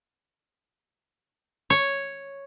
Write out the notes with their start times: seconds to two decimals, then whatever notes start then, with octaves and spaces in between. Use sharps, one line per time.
1.70 C#5